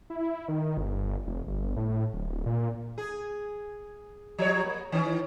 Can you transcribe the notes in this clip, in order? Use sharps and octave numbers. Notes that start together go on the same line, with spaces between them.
E4
D#3
G1
F1
G1
A2
D1
A#2
G#4
F3 G3 C#5
A#3
D#3 E3 C#4